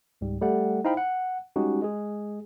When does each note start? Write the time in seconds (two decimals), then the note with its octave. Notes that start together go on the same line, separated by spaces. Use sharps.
0.21 C#2 G#2 G3
0.42 G3 A3 A4 F#5
0.84 D#4 E4 C5 F5 G5 B5
0.97 F#5
1.56 G3 G#3 C#4 D#4 F#4 G4
1.82 G#3 G#4